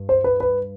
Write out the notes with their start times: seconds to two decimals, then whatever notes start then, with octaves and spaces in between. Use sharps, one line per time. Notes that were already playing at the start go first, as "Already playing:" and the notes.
Already playing: G2
0.09 C5
0.24 B4
0.40 B4